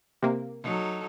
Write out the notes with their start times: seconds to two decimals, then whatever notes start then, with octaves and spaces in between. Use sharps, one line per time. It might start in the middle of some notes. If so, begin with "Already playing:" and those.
0.23 C3 A#3
0.63 F#3 D#4 A4